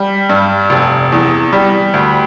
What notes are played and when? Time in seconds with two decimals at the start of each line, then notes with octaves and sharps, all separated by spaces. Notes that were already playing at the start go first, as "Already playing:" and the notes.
Already playing: G3
0.29 G2
0.70 F1
1.12 E2
1.53 G3
1.94 D2